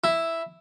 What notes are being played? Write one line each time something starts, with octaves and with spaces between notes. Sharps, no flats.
E4